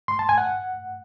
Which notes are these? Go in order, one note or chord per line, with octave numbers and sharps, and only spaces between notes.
C6
A5
G#5
F#5